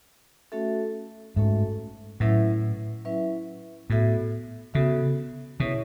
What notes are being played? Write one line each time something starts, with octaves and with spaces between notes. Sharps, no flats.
A3 C#4 F#4 A4 E5
G#2 A3 C#4 F#4 A4 E5
A2 F#3 C#4 E4 B4 E5
F#3 C#4 E4 B4 E5
A2 B3 F#4 A4 E5
C#3 B3 F#4 A4 E5
B2 C#4 E4 G#4 C#5 E5